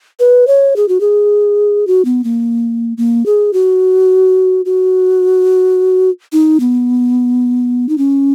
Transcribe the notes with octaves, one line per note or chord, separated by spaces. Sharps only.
B4
C#5
G#4
F#4
G#4
F#4
B3
A#3
A#3
G#4
F#4
F#4
D#4
B3
D#4
C#4